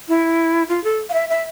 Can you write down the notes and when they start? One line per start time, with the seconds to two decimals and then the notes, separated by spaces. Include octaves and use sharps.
0.09 E4
0.69 F4
0.84 A4
1.10 F5
1.14 E5
1.29 E5